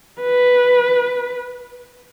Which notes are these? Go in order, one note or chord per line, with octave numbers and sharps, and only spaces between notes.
B4